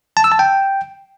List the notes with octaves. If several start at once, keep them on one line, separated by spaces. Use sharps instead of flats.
A5
E6
A5
G5